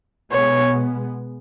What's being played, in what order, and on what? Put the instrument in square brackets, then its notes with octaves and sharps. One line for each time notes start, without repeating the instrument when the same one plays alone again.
[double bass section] B2 G#3 B3 [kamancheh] C#5